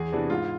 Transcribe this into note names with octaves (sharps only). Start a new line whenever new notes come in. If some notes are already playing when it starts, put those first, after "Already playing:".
Already playing: E2 G#4
C3 E3 B3 D4
G#2 F4